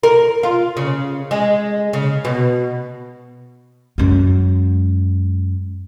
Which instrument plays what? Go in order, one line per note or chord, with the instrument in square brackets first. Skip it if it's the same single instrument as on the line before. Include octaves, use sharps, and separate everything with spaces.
[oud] A#4
F4
C#3
G#3
C#3
B2
[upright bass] F#2 G#3